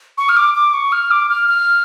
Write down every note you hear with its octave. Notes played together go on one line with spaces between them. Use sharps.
C#6
F6
D6
D6
C#6
F6
D6
F6
F6